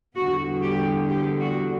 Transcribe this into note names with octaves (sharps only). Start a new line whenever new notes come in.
E2 D3 G3 B3 F#4
G4
G4
F#4